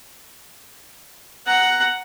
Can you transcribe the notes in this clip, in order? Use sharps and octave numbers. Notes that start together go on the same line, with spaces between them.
F#5 A#5